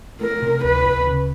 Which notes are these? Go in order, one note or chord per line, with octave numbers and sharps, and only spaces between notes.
A3 A#4
C3
D2 B4
D2
C#3